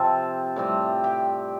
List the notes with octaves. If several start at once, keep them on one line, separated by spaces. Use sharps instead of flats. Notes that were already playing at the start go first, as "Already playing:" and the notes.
Already playing: C3 F3 C4 A4
A2 G3 C4
G4 G5